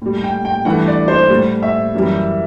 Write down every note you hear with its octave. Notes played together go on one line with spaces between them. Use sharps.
A2 G3
G5
G5
G2 E3 A3 F#5
D5
C5
A2 G3
E5
F#2 E3 G3